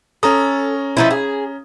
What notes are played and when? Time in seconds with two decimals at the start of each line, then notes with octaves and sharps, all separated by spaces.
0.23 C#4 A4 A#5 D#6
0.97 F3 D#4 E4
1.10 G#4